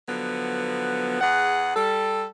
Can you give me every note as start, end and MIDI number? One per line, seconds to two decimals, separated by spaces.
0.08 1.19 50
0.08 1.19 53
0.08 1.19 54
0.08 1.19 59
1.21 1.75 40
1.21 1.75 68
1.21 1.75 78
1.76 2.25 55
1.76 2.25 69